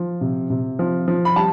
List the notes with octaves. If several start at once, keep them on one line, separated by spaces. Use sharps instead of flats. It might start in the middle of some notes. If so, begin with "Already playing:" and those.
Already playing: F3
C3
C3
F3
F3
B5
G3 A5